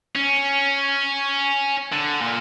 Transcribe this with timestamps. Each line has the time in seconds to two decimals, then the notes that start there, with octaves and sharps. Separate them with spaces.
0.16 C#4
1.92 D3
2.21 A#2